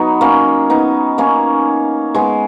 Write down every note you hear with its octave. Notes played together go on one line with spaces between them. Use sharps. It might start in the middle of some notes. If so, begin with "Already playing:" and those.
Already playing: F#3 B3 D#4
A#3 C#4
B3 D#4
A#3 C#4
G#3 B3